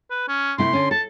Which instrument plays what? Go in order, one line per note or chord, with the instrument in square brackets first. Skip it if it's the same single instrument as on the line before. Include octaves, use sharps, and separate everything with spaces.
[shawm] B4
C#4
[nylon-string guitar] C3 A3 E4 [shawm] C6
[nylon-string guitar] D3 C#4
[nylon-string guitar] A4 [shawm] A5